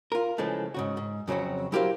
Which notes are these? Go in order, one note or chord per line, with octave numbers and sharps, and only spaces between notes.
F4 A#4
C#3 E3 F3 G#3 A3
G#2 C#3 F#4
G#2
F2 C#3 F#3 C4 F#4
F#3 E4 G4 A#4 C5 F5